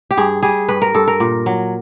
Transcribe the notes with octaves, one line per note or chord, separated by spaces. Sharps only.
G4
G2 G#4
G3 G#4
G2 B4
A#4
G2 A4
A#4
A#2
F#3